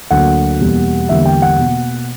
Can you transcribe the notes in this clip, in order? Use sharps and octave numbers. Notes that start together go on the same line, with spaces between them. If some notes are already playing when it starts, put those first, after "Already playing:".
D2 D3 F#3 A#3 F#5
E2 B2 G3 A#3
E2 D3 G3 A#3 E5
G5
F#5
B2 A#3